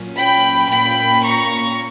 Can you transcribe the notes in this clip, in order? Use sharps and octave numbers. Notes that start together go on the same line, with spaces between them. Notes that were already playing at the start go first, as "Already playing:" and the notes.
Already playing: A#2 F#3 C#4
G5 B5
A#2 A#3 C#4 G5 B5
A#5 C#6